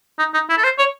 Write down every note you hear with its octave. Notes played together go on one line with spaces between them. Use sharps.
D#4
D#4
E4
A4
C5
C#5